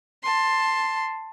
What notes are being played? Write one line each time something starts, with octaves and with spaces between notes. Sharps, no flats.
A5 C6